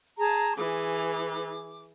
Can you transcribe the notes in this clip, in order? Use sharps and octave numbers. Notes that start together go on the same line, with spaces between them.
G#4 A5 A#5
E3 G#4 D6